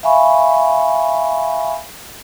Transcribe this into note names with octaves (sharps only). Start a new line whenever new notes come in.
E5 F5 G#5 B5 C#6